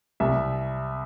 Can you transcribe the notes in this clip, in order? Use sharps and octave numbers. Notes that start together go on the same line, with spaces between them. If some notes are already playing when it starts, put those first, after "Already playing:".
C2 E5